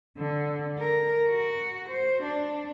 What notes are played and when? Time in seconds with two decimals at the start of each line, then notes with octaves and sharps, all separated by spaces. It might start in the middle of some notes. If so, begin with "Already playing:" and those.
0.18 D3
0.78 A#4
1.29 F#4
1.90 C5
2.24 D4